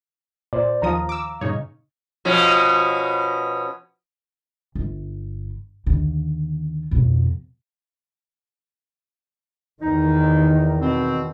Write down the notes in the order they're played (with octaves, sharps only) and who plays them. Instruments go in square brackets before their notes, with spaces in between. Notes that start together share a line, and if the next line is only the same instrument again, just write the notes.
[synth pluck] A#2 [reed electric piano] C5 D5
[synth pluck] D#2 F3 D#6 [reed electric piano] F5 A#5
[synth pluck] D6 E6
[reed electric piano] G2 A#2 [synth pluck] C#3 D#4 C#5
[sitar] B2 F3 C#4
[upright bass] G1
D#2 D3
F2 B2
[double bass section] E2 D#3 [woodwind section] D#4
[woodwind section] B2 C4